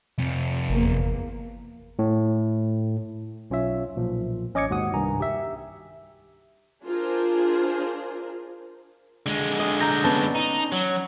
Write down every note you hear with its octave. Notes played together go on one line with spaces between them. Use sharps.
F2 C3
G1 E2 A#3
A2
B1 C#4 F4 C#5 E5
B1 A#2 F3
A1 C#4 D#5 D6 G#6 C#7
D#2 G#2 F#4 F#5 D#6
C2 G2 D#3 G#5 A#5
G4 E5
D4 F4 G#4 A#4 C5
D3 G#3
D#5
A#5 G6 A#6
B3 C#4 A5
D#4
F#3